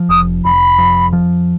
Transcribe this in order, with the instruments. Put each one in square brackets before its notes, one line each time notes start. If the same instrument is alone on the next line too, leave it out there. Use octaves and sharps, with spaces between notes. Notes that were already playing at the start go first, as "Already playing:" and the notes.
Already playing: [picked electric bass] F3
[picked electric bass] F1 [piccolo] D#6
[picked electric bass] F1 [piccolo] B5
[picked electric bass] F2
F3